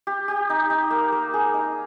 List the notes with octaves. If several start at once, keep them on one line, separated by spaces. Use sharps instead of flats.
G4
G4
D#4
D#4
A#3
A#3
G#4
D#4